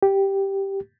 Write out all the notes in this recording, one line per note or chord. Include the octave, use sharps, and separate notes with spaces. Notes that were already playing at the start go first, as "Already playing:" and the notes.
G4